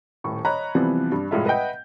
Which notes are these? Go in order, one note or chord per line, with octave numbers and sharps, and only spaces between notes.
D#1 A2 C#6
C#5 D#5 A#5 B5 F#6
C3 E3 F3 G3 B3 C4
G2 G3
F1 A2 G3 G#3 F4 E5
B4 D#5 E5 F#5 G5 G6